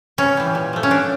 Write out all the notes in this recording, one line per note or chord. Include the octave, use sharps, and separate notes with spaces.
C#3 C#4
E3 G3
A#2
F3 A3
C#4
A#2 D4